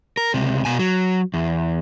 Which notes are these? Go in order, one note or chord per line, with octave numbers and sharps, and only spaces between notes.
A#4
C#2 C3
B2 G#5
F#3
E2